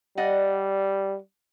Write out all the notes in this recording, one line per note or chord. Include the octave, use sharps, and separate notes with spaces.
G3 D5 D#5 F#5